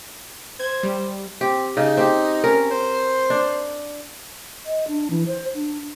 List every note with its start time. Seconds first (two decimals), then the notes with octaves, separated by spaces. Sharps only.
0.60 C5 G#6
0.83 G3
1.41 C4 G4
1.77 C#3 D#4
1.97 C4 G4
2.44 C#4 A#4
2.71 C5
3.30 D4
4.65 D#5
4.88 D4
5.11 E3
5.27 C5
5.55 D4